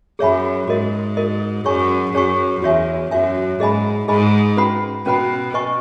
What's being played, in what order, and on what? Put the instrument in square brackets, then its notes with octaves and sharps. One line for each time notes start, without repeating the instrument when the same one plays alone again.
[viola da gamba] F#2 [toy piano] G#4 C#5 E5 G#5 B5
[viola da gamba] G#2 [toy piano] F#4 A#4 D#5
[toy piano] F#4 A#4 D#5
[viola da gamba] F#2 [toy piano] G#4 C#5 G#5 C#6
[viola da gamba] F#2 [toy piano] G#4 C#5 G#5 C#6
[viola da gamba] E2 [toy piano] F#4 C#5 E5 G#5
[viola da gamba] F#2 [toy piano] F#4 C#5 E5 G#5
[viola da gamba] G#2 [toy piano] G#4 D#5 G#5 B5
[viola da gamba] G#2 [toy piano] G#4 D#5 G#5 B5
[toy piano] C#4 F#4 B4 F#5 B5
[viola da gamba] B2 [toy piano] C#4 F#4 B4 F#5 B5
[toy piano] B4 D#5 G#5 C#6